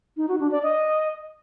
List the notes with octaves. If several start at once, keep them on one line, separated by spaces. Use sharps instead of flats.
D#4
F#4
D4
D5
D#5